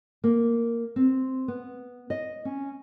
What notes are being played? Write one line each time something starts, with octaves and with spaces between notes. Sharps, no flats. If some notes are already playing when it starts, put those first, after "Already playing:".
A#3
C4
B3
D#5
C#4